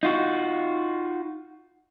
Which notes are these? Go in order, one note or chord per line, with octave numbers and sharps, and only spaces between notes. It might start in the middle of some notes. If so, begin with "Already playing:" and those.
D#4 F4 F#4